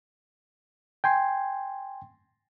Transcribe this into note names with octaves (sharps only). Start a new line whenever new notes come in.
G5 G#5 C6